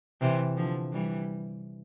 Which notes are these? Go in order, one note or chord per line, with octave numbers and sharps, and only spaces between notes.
C3 E3
D3 F3
E3 G3